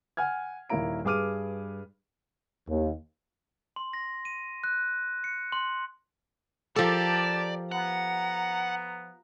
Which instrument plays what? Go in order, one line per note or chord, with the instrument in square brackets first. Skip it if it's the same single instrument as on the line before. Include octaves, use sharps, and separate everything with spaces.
[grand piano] F#5 G#5 F6 G#6
D#1 D#3 A#3 E4 A#5 D7
G2 G#4 B4 D6 F6 D#7
[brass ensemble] D#2
[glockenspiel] C6
A#6
D#7
F#6
C#7
C6
[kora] F3 A4 [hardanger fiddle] G4 A#4 [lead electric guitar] D5 [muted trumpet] A5
[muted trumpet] B3 [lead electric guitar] F#5 [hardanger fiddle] A#5